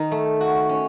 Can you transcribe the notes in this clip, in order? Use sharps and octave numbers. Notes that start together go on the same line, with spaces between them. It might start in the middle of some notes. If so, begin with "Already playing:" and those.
Already playing: D#3 D#4
A3
F#4
C#4